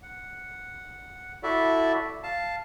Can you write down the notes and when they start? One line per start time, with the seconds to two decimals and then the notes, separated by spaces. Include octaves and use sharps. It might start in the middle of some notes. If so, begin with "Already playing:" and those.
0.03 F#5
1.43 E4 F#4 A4 D5 E5
2.23 F5 A5